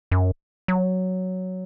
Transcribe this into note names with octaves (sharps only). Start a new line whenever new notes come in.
F#2
F#3